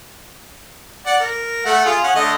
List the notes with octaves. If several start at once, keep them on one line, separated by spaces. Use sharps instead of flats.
D5 F#5
A#4
A3 F#5
F4 G#4
C#4 F#5
D3 A3 D#5